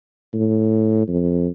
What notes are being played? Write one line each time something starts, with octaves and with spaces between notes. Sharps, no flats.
A2
F2